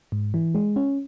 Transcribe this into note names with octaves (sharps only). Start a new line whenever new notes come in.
G#2
E3
G#3
C#4